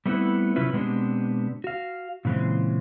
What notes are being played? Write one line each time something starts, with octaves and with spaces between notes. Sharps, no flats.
G3 A3 B3 C4 E4 B4
C3 F#3 C#4 E4 F4 B4
B2 G#3 B3 C4 D4 G4
F#4 F5
A#2 C#3 E3 G#3 C4